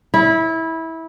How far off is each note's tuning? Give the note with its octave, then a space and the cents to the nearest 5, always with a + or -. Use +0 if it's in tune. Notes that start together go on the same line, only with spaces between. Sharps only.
E4 -20